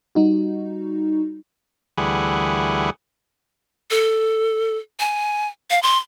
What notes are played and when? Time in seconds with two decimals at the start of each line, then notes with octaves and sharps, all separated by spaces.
0.15 G3 D#4 F#4
1.98 D2 E3 G3 G#4 F#5
3.91 A4
5.00 G#5
5.70 F5
5.83 C6